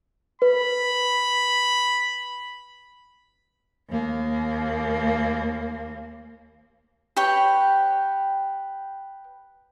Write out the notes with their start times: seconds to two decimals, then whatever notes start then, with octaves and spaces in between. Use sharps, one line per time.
0.42 B4 B5
3.90 D#2 A#3
7.17 G4 B4 C#5 G5